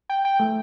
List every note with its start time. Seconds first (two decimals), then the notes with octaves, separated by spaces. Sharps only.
0.10 G5
0.25 G5
0.40 A3